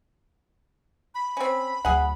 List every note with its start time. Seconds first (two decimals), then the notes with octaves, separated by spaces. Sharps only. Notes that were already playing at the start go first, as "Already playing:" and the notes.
1.15 B5
1.37 C4 C#4
1.85 D2 F#3 G#4 F#5